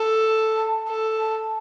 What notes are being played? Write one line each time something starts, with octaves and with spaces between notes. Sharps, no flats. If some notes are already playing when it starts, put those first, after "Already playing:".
Already playing: A4
A5
A4
A5